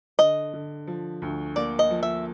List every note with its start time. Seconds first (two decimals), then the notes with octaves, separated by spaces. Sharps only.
0.19 D3 D#5
0.53 D3
0.87 F3
1.22 D2
1.56 A#3 D5
1.79 D#5
1.91 F3
2.03 E5